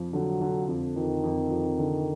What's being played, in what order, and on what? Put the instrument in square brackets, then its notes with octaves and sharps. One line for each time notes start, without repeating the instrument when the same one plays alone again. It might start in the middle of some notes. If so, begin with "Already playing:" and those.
Already playing: [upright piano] F2 F3
[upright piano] D3 [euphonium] F#3
[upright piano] D3
F2
[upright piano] F2 [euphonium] D#3
[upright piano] F2
F2
D3